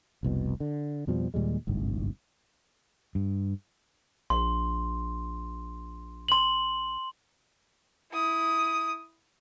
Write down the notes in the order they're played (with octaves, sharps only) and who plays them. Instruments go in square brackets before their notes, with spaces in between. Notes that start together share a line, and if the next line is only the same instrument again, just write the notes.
[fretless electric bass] F1 C2 B2
D3
F2 B2 F3 G3
D#2 A#2 G3 G#3
D1 G1 C2 G#2
[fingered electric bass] G2
[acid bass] A#1 [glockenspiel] C6
[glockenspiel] C6 F#7
[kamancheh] E4 D#6